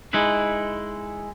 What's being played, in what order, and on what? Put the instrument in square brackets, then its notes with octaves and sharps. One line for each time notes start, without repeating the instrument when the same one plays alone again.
[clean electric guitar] G#3 D#4 E4 B4